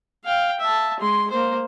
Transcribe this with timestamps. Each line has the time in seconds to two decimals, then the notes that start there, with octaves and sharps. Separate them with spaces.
0.25 F5 G5
0.60 E5 A5
0.99 G#3 C6
1.31 A#3 C5